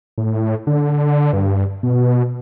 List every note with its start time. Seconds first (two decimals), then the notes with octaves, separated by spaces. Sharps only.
0.18 A2
0.67 D3
1.33 G2
1.83 B2